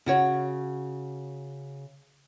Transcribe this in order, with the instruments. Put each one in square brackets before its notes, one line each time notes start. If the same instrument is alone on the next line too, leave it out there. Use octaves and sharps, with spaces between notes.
[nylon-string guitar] C#3 F#4 C#5